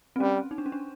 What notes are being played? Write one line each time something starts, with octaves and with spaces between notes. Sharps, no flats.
C4
G3 C#4
D#4
D4
C#4
D4